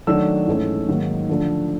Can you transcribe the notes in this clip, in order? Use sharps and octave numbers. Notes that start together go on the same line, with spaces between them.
D#3 F#3 A3 D4 E6
G#2 E3 A3 C#4
G#2 D#3 F#3 A#3 D#4
D3 F3 A3 D4